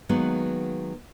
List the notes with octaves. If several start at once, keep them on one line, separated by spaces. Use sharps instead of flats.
D#3 F#3 G#3 A#3 B3